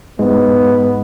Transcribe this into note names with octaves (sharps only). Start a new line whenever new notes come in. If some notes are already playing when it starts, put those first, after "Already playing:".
G#2 G#3 B3